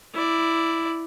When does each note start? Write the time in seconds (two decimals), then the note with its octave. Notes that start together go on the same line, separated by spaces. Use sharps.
0.14 E4 D5